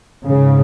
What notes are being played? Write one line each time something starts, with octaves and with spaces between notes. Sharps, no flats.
G#2 C#3